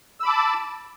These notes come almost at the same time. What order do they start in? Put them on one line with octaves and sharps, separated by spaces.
E6 B5 D6 A5